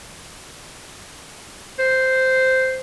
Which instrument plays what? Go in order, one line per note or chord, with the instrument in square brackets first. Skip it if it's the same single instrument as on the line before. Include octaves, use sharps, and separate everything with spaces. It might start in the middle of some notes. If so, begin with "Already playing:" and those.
[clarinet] C5